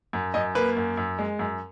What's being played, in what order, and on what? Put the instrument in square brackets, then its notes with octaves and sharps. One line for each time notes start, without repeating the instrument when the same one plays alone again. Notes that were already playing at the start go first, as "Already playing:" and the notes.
[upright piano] F#2
F#2 D#5
A#3 B4
F#2
F#2
G#3
F#2